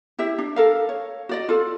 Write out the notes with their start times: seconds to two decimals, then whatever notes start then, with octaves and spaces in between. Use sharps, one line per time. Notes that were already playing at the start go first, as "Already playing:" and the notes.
0.19 E4 G4 E5
0.38 D4
0.56 A4 A#4 F5
0.89 C#5
1.29 F#4 D5 D#5
1.49 F4 A4